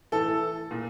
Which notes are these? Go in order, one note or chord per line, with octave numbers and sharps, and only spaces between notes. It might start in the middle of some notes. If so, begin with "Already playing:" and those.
A2 E3 A4
A#2